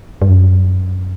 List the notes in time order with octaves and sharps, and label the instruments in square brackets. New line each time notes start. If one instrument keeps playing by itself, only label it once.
[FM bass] G2
F#2